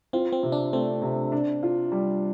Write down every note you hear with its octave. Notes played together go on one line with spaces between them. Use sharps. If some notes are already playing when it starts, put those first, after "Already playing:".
C4 F4
C4
C3
D4
A3 C4
C3
D4
F4
G3